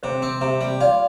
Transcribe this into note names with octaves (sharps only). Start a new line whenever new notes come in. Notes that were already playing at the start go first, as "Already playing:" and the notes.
C3 C5
C4
C3
G3
F4 D5